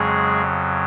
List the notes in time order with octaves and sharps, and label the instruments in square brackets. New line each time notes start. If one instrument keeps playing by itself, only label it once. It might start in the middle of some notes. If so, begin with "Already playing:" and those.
Already playing: [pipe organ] F2 C#3 F#3 G#3 G#4